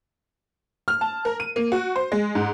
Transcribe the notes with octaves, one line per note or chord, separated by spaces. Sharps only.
F6
A5
A#4
D#7
A#3
F#4
C5
G#3
G#2